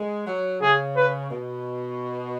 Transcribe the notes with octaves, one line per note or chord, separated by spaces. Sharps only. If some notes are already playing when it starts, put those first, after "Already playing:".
Already playing: G#3
F#3
C#3 G#4
B4
B2